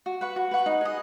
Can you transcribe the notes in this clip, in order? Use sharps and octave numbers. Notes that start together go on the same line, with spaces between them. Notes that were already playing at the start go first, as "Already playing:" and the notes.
F#4
B4 F#5 C#6
F#4
B4 F#5 C#6
D#4
G#4 D#5